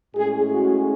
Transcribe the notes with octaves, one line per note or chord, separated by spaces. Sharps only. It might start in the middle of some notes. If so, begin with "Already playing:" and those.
A2 G#3 C#4 G#4
F#4